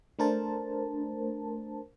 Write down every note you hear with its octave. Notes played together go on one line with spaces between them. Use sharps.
A3 D4 A#4 C5 A5